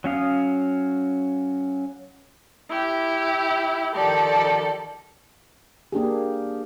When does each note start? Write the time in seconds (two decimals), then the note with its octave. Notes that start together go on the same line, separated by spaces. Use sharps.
0.04 F#3 C#4 F5 D#6
2.69 E4 G4
3.94 D#3 F3 G4 A4 D5
5.92 A#3 D4 G4 G#4